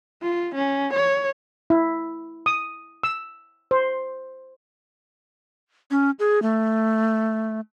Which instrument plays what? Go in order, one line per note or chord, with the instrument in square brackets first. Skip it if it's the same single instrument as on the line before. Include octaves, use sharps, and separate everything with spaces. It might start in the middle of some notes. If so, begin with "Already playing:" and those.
[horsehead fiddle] F4
C#4
C#5
[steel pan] E4
D#6
E6
C5
[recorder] C#4
G#4
A3